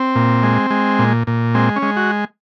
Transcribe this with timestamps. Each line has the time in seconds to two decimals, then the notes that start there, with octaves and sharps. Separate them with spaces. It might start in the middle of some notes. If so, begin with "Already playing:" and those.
Already playing: C4
0.15 A#2
0.43 G#3
0.70 G#3
0.99 A#2
1.27 A#2
1.55 G#3 C4
1.76 C#4
1.82 G#3
1.96 F#4